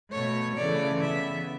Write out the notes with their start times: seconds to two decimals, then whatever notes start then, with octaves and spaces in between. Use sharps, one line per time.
0.12 B2 A3 C#5
0.56 C#3 E3 A3 D5
1.00 C#3 E3 B3 E5